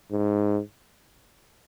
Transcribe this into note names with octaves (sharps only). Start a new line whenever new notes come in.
G#2